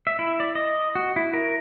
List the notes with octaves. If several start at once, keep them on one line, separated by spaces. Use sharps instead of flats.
E5
E4
D5
D#5
F#4
E4
A#4